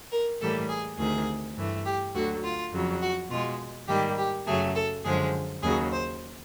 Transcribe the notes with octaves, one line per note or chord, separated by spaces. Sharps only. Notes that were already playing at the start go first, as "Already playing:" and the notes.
A#4
A2 E3 G3 A#3 A4
G#4
D2 C3 D#3 G#4
G2 E3 A3
G4
D2 D3 F#3 F#4
F4
F2 C#3 F#3
F#4
B2 G#3 F4
G#2 D#3 G3 A#3 G4
G4
F#2 C#3 F#3 A3 G#4
A4
F#2 D3 F3 G#3 G#4
D#2 C#3 F#3 G#4
C5